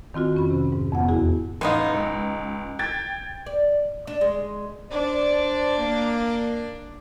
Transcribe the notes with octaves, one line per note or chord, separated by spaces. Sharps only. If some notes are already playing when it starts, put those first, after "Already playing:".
D#3 C4 F4 F#4
F2 C#4 B5
C3
G#2
F2 B3 F#5
E2 E4 F#4 G#4
A1 G#3 B3 D#4 F5
C#2
G5 G#6 A6
D5
D4
G#3
D4 C5 D5
A#3